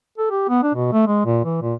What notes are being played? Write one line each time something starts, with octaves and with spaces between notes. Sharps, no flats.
A4
G4
B3
D4
B2
A3
G#3
A#2
E3
A#2